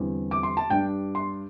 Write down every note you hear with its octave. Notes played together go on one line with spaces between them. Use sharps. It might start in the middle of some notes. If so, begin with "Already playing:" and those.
Already playing: E2 D3 G3 C4
D6
C6
A5
G2 G3 D4 G5
C6